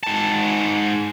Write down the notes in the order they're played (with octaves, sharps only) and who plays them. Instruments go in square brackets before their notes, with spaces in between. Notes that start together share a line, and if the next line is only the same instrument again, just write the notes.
[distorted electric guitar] G#2 A5